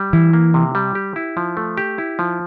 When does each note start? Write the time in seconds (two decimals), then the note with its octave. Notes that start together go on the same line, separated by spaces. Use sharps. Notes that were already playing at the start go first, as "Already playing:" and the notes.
Already playing: G3
0.13 E3 E4
0.33 A#3
0.54 C3
0.75 G3
0.95 G4
1.16 E4
1.37 F3
1.57 A3
1.78 G4
1.98 E4
2.19 F3